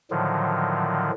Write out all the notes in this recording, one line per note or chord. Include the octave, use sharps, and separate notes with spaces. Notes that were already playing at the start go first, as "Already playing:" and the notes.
A2 D3 D#3 F3 F#3